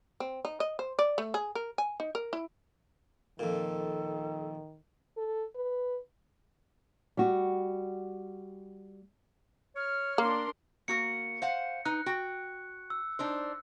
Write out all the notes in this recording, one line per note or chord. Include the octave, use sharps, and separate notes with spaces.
C4
D#4
D#5
C5
D5
A3
G#4
A#4
G#5
D#4
A#4
E4
F2 A#2 D#3 A4
A4
B4
G3 F#4
C#5 F6
A#3 D4 A#4 C6
A#3 F#4 A#4 C#7
C5 F5 F#5
D#4 B4 F#6
F#4 G5
E6
D4 D#4 C5